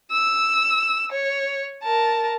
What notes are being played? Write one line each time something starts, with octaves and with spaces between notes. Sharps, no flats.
E6
C#5
A#4 A5